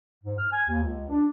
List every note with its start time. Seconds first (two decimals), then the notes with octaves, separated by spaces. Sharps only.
0.24 G#2
0.39 F6
0.52 G#5
0.69 D#2
0.83 C#2
1.10 D4